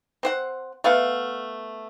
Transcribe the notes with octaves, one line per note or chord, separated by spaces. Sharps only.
C4 C5 F#5
A3 B3 F5 F#5